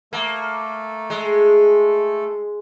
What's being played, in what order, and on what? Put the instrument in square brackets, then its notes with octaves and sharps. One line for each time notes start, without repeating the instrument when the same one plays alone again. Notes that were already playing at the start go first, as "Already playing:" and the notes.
[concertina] A3 A4 [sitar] A#3
[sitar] G#3